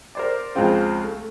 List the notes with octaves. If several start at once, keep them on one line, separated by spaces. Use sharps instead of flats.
A#4 C5 D5
C#2 F3 G#3 C4 F4
A3